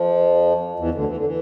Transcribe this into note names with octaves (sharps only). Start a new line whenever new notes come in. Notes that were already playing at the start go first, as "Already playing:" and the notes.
Already playing: F2 F3
E2 E3
D2 D3
E3
D3
E3